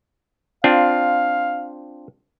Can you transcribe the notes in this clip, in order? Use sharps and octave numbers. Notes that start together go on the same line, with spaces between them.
C4 D4 F4 F5